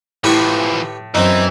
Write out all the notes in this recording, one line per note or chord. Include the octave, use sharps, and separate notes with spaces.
A2 E3 F3 G4 B4 C#6
F#2 E3 C4 D#4